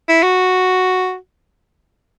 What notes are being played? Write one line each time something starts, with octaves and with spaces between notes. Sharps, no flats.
E4
F#4